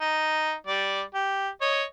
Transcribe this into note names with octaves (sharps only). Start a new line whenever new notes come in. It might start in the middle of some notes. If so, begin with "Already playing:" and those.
D#4
G3 D5
G4
C#5 D#5